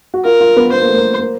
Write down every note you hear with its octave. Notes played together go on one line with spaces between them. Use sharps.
F#4
F4 A#4
F4
B3
B3 C5
A#3
A3
A#3
A#3